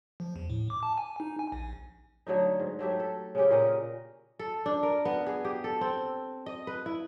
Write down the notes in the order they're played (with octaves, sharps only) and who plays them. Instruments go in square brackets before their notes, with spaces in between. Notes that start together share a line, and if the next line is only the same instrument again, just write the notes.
[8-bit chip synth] F3
E2
A2
D6
A5
G#5
D#4
G#5
A#1
[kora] D3 F#3 A3 D#4
G#2
F#3 A3 G4 E5
A4
C#3 C4 C#4 G4
A#2 C#4 A#4 D#5
A4
D4
A#4
B3
G#4
G4
A4
C4
D#5
B4
E4